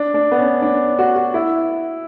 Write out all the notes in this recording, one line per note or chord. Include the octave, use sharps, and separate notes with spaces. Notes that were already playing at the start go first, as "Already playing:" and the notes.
Already playing: D4
D4
B3
C#4
D4
F#4
F#4
E4